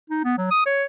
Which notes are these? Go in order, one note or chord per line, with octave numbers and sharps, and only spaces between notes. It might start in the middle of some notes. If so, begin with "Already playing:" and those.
D#4
B3
F#3
D#6
C#5